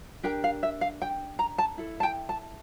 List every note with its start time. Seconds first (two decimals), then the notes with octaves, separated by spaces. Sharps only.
0.23 D4 G4 A#4 G5
0.44 F5
0.63 E5
0.81 F5
1.02 G5
1.39 A#5
1.58 A5
1.78 E4 A4
2.00 A5
2.03 G5
2.29 A5